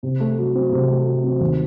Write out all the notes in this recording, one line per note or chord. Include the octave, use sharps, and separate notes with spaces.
C3
A3
F#3
C4
C3
A3
F#3
C4
D#2